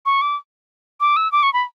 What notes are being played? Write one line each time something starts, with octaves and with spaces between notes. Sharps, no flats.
C#6
D6
D6
E6
D6
C#6
B5